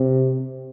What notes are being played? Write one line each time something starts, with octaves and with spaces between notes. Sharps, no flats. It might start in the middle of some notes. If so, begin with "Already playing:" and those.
Already playing: C3